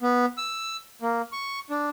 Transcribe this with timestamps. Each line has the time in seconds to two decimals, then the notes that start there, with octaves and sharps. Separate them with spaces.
0.01 B3
0.37 E6
1.02 A#3
1.32 C#6
1.70 D4